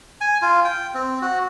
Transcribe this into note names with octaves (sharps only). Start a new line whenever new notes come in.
G#5
F4
G5
C4
F#4